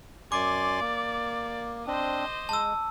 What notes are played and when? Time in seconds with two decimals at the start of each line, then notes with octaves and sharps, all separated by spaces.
0.32 F#2 D5 G#5 C6 D6
0.80 A#3
1.87 C4 D4 C5 D#5
2.49 G#3 A5 E6